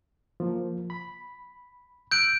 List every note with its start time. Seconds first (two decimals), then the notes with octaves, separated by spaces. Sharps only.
0.40 F3 A#3
0.90 B5
2.11 E6 F#6 G6 D7